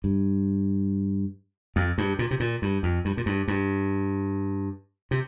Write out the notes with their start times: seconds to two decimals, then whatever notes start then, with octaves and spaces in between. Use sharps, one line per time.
0.04 G2
1.76 F2
1.98 G2
2.19 A#2
2.31 C3
2.40 A#2
2.62 G2
2.83 F2
3.05 G2
3.17 A#2
3.26 G2
3.48 G2
5.11 C3